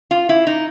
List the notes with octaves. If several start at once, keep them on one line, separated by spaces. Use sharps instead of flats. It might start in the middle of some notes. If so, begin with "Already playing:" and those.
F4
E4
D#4